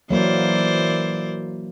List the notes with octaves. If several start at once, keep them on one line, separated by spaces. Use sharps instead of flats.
E3 F#3 A#3 A#4 C5 D5